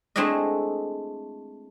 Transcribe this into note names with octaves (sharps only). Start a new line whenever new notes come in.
G#3 A3 C4 D4 E4 D#5